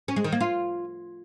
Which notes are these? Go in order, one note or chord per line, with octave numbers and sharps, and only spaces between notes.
C#4
G#3
D#3
A#3
F4